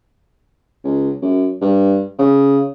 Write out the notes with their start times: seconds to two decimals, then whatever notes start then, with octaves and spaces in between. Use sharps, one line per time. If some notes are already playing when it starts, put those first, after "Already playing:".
0.84 C#2
1.22 F#2
1.61 G2
2.19 C#3